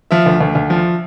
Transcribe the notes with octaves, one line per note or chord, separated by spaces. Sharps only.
F3 E5
D2
D2
D2
F3